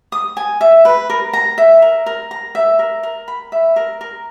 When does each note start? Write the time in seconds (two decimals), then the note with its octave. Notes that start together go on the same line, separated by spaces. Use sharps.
0.12 D#6
0.37 G#5
0.61 E5
0.85 B4
1.10 A#4
1.33 A#5
1.58 E5
1.82 A#4
2.06 A#4
2.31 A#5
2.55 E5
2.79 A#4
3.03 A#4
3.28 B5
3.52 E5
3.76 A#4
4.01 A#4